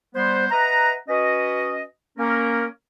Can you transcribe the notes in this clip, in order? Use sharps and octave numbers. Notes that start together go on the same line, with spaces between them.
G3 B3 C5
B4 D#5 E5 F#5 A#5
C#4 F#4 B4 D#5
A#3 C#4 A#4